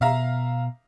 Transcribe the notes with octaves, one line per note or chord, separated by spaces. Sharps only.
B2 E5 F5 A#5